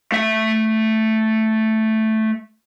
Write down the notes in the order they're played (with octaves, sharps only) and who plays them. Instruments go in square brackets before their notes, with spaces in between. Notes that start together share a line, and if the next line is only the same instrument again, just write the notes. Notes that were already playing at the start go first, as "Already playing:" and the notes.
[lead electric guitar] A3 E5